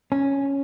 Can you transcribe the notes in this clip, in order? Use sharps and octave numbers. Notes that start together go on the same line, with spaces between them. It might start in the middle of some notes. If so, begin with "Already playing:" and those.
C#4